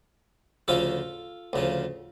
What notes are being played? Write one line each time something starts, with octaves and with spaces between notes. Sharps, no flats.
D2 C#3 F3 F4 A4
D2 C#3 F3